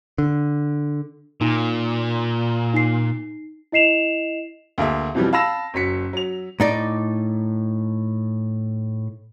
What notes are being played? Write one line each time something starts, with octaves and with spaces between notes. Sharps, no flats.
D3
A#2 D#4
D#4 C7
E4 D#5 C7 E7 F7
D2 A#3 G#4 E5
F2 B2 E3 F3 G3
F5 A5 B5 E6 A#6 E7
F#1 F#3 B6 C#7
F#3 F7
A2 D#4 D5